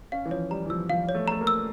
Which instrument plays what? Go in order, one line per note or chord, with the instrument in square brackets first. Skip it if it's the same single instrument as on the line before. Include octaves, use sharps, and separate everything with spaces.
[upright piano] C#4 [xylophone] F5
[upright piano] E3
[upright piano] F3 [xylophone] C#5
[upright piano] G3 [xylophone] A#5
[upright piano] E3
[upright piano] F3 [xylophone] E6
[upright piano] F3 [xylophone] F5
[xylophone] C#5
[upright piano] A3
[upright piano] A3 [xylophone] A#5
[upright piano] A#3
[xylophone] E6